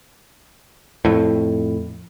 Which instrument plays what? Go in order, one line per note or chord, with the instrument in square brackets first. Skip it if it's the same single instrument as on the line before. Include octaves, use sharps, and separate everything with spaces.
[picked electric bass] F2 A2